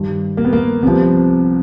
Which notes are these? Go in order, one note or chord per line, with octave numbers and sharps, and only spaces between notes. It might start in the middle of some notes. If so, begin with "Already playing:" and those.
Already playing: G2 D#3
A#3
B3
A#3
C2 C3 F3 B3